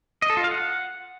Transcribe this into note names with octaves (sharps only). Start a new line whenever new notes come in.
D#5
A4
F4
F5
F#5